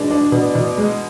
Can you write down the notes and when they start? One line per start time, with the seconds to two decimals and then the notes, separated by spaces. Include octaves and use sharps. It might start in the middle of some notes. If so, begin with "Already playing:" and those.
Already playing: B2 G#3 D4
0.11 D4
0.32 B2
0.55 B2
0.77 G#3